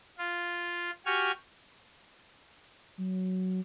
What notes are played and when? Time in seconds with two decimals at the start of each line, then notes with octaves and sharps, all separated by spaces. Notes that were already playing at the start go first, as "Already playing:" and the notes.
0.18 F4
1.06 F#4 G4 G#5 C#6 F6
2.98 F#3